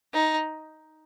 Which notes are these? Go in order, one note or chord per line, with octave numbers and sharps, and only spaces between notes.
D#4